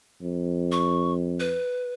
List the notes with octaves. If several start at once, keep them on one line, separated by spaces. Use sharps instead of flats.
F2
C#6
B4